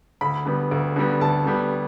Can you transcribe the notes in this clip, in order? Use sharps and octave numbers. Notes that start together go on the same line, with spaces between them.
D2 B5
D3 G3 B3
D2
D3 G3 B3
D2 A5
D3 G3 B3